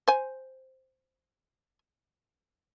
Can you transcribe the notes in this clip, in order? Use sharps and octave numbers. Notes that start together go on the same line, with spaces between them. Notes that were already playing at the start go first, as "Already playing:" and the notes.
C5 G#5